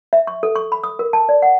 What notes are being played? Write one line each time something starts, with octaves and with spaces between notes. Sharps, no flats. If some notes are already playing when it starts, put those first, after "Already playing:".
E5
C#6
A4
C#6
B5
D#6
A#4
A5
D5
F#5